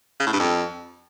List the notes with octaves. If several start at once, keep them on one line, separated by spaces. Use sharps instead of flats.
C#3
A2
G2
F2